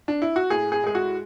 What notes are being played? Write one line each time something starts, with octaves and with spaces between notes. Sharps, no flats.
D4
E4
F#4
A2 G#4
G#4
G#3 G#4
F#4